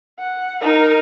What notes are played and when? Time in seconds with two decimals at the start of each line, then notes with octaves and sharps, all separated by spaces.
0.19 F#5
0.61 D#4 A#4